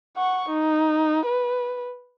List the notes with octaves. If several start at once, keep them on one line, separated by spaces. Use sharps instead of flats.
F#5 C#6
D#4
B4